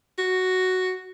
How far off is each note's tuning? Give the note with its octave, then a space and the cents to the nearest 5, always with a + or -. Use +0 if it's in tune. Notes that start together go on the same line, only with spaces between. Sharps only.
F#4 +5